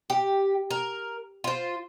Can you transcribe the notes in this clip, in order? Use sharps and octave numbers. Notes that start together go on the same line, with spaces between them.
G4
A#4
F4 C5